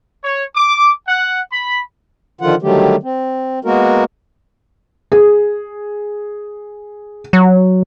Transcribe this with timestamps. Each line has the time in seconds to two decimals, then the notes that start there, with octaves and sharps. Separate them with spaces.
0.24 C#5
0.56 D6
1.08 F#5
1.52 B5
2.41 D3 D#3 F3 F4 F#5
2.62 D3 D#3 F#3 G3 A3 G4
3.03 C4
3.65 G#3 A#3 B3 F#4 A#4
5.12 G#4
7.33 F#3